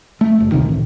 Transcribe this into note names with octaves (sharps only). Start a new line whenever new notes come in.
A3
F#1
C#2 C3 D#3
A1